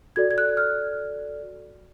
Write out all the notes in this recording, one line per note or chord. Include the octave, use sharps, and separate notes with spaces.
F#4 A4 D5 G#6
G#6
F#6
F6